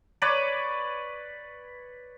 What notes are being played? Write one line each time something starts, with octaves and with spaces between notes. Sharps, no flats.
B4 C#5 D5